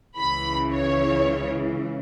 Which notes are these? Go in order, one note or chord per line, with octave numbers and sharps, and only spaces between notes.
C#2 C#3 E3 B5
C#5